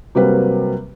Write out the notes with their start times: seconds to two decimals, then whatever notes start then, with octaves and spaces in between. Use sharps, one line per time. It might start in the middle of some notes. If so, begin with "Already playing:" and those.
0.15 C3 F#3 G3 A#3 C4 B4